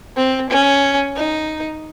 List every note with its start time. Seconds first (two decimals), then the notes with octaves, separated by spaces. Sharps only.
0.16 C4
0.50 C#4
1.16 D#4